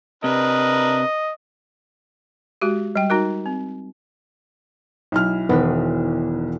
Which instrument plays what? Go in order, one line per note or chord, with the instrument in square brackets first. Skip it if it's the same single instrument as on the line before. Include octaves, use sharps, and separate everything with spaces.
[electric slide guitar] C3 [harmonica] D4 A#4 B4 [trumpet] D#5
[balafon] G#3 F#4 G4
G3 G5
D#4 F#4 A#4
C4
[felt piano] B1 E4 F6
[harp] E1 B4 [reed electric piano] D#3 B3